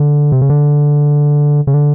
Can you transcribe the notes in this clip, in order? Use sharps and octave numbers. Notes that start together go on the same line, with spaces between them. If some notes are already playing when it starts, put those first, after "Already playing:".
Already playing: D3
C3
C#3
D3
C#3
D3